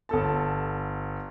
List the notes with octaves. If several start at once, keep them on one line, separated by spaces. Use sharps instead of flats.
G1 A4 A5